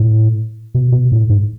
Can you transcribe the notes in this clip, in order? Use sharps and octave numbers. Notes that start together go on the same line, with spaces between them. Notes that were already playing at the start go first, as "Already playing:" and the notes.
Already playing: A2
B2
B2
A2
G#2